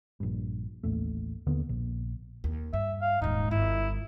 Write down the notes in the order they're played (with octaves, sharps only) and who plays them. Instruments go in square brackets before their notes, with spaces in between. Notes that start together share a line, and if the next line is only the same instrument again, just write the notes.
[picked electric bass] A#1 G2
A1 D#2 A3
D#2 D3 B3
A#1
[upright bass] D#2
[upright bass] G2 [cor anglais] E5
[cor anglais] F5
[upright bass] D#1 G#2 [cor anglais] D#4
[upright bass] G1 [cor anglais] E4